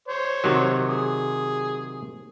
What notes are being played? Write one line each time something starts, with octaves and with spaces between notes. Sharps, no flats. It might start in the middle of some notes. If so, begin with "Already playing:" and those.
C5 C#5
C3 D#3 F#3
G#4